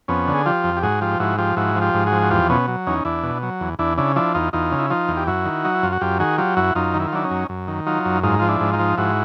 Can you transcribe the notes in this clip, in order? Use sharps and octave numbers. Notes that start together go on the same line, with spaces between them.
F2 B3 C#4
D3
G#4
F3 F4 G4
F2
G4
G#2 F#4 G#4
F3 F4 G4
G#2 E4 F#4
F3 F4 G4
G#2 E4 F#4
F3
F4 G4
G#2
F#4 G#4
F3
F#4
E2 F4 G4
B2 B3 C#4
F#3
E2 C#4 D#4
E2 D4 E4
B2
F#3
E2
E2 D4 E4
C#3 D4 E4
F3 D4 E4
E2 D#4 F4
E2 D#4 F4
C#3
E4
F3 D#4 F4
E2
G4
F#2 E4 F#4
D#3
F#3 D#4
E4
F#2 F4
F#4
F#2 F4 G4
D#3 F#4 G#4
F#3 F4 G4
F#2 E4 F#4
F#2 D#4 F4
D#3
E4
F4
F#3 D4 E4
C#4 D#4
F#2
F#2
D#3
F#3 D#4 F4
F#2
G#2 D#4 F4
F3 F4
D4 E4
G#2
D#4 F4
F3
G#2 E4 F#4